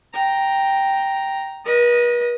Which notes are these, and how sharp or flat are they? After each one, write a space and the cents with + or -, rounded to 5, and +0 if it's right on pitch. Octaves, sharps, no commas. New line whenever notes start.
G5 +0 A#5 +0
B4 -45 D#5 +0